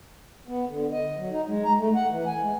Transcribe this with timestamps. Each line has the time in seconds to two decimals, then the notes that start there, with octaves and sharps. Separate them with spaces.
0.48 B3
0.69 D3
0.92 D#5
1.17 F#3
1.31 D#4
1.47 G#3
1.64 A#5
1.78 A3
1.95 F#5
2.10 E3
2.26 G#5
2.41 G#3